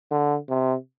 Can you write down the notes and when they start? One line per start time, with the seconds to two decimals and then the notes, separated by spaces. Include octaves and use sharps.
0.11 D3
0.49 C3